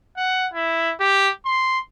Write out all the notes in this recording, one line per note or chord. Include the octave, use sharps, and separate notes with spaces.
F#5
E4
G4
C6